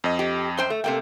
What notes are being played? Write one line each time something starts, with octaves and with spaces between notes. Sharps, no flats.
F2 D#5
G4
F#2 C5 G5
A3
C3 A3 A#3 G5